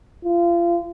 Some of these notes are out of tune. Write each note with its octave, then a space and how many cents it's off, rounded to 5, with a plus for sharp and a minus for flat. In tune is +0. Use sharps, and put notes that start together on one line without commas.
F4 -30